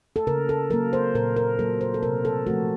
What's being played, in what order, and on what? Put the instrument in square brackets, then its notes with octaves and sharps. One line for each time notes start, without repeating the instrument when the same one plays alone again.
[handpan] A4
C#3 A#4
A4
F#3 A#3 A#4
C5
A#2 A#4
A#4
F#3 A#3 A4
C5
A4
C3 A#4
A4
F3 A3 F#4